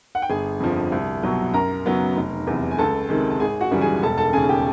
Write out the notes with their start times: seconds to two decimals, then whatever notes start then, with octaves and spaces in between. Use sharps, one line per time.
0.15 F#5
0.22 G5
0.30 G1 G#4 G#5
0.60 F2 D3 F3
0.92 C2
1.23 B2 F#3 B3
1.54 F#2 A#4 A#5
1.86 C#3 F#3 B3
2.16 F1
2.47 E2 C3
2.71 G#5
2.78 C#2 A4 A5
3.09 C3 D#3 G#3
3.31 A5
3.40 G#1 G#4 G#5
3.61 F#4 F#5
3.71 F#2 C#3 E3 G3
3.81 G#4 G#5
3.96 G#5
4.02 E1 A4 A5
4.18 A4 A5
4.33 D#2 C#3 G#4 G#5
4.49 G4 G5